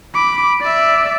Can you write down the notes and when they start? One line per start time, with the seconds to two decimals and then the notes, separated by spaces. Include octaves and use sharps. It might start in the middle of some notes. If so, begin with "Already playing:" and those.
0.14 B5 D6
0.61 D5 E5